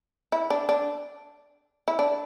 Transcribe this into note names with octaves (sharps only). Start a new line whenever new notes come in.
E4
D4
D4
E4
D4